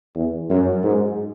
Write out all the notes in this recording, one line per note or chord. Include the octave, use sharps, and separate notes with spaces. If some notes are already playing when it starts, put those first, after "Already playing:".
E2
F#2
G#2